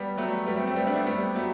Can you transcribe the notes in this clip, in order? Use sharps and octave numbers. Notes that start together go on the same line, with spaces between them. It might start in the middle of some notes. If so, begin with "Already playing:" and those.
Already playing: G3 B3
F#3 A3
G3 B3
A3 C4
A3 C4
G3 B3
B3 D4
A3 C4
G3 B3
F#3 A3